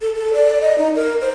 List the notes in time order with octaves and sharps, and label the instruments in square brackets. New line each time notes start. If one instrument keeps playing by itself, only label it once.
[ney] A4
A4
D5
D#5
D#4
A#4
C5